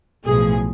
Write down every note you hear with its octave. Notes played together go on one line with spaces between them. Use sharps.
B1 A2 F3 G#4